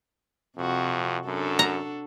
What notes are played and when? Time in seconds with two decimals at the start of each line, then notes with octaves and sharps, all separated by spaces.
0.57 F2 C3 F#4
1.26 F#2 D4 F#4 A4
1.59 A#5